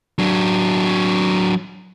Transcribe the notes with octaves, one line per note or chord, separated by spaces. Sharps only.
F#3 D4